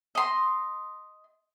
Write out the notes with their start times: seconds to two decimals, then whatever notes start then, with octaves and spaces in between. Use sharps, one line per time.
0.15 D#5 C6